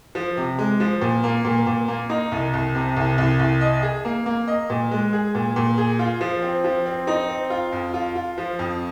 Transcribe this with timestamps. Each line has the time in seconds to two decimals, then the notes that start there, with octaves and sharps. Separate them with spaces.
0.15 F3
0.37 C3
0.59 G#3
0.80 F3
1.01 A#2
1.24 A#3
1.45 A#2
1.67 A#2
1.88 A#3
2.10 D#4
2.32 C2
2.53 C2
2.75 C3
2.96 C2
3.18 C2
3.39 C2
3.61 D#5
3.83 G#4
4.05 A#3
4.26 A#3
4.48 D#5
4.70 A#2
4.91 G#3
5.13 G#4
5.35 A#2
5.56 A#2
5.78 G#4
5.99 F4
6.21 F3
6.42 C4
6.64 F3
6.86 C4
7.07 D#4
7.29 C4
7.50 F4
7.72 F2
7.94 F4
8.15 F4
8.38 F3
8.59 F2